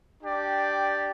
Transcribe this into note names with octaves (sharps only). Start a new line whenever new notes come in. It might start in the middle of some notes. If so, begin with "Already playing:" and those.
D4 G4 D5 G5